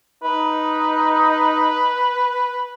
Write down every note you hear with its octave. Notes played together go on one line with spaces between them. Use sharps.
D#4 B4